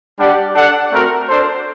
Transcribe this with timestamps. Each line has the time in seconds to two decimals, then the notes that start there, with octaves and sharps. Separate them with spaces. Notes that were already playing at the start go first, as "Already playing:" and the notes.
0.19 G3 D4 G4 D5 F#5
0.55 D4 A4 D5 F#5
0.92 A3 C4 F#4 A#4
1.28 D4 A4 C5